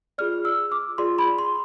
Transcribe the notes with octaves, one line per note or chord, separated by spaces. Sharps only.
F4 G#4 D5 F6
E6
D6
F4 G#4 D5 C6
B5
C6